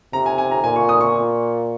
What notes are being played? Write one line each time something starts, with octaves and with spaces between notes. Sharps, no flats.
C3 A#5
G#5
G#5
A#5
A#2 G#5
C#6
D#6
C#6